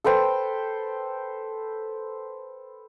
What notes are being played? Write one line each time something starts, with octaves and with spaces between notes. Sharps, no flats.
A4 B4 C5 G5